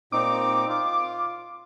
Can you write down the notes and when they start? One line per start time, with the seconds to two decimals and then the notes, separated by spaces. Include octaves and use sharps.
0.12 A#2 C4 D#4 D6
0.69 F4